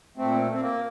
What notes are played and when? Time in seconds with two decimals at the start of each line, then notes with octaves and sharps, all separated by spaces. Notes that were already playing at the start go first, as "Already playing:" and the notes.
0.17 A#2 A3 C4
0.53 C4
0.61 A#3